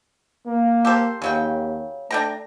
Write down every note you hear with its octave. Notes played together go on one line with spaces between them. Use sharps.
A#3
G4 A4 C5
D#2 C#3 F#3 G5
A3 D4 G5 A#5